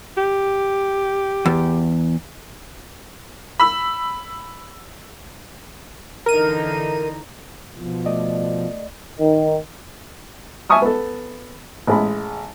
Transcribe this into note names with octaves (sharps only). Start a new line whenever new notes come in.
G4
E2
B5 E6
D3 E3 D#4 A#4 D#7
C2 B2 F3
A3 D5 D#5
D#3
E5 G#5 A5 C#6 D#6 F6
B3 A4
A1 G#3 B5